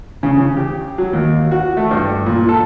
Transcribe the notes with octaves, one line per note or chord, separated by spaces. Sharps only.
C#3
C#3
G4
F#3
D#2
F#4
A3
G2
A#2
A4